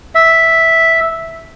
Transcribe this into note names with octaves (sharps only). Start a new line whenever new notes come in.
E5